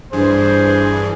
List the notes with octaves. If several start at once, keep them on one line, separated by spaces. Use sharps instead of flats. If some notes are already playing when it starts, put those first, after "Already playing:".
G2 E3 D4 G#4 C5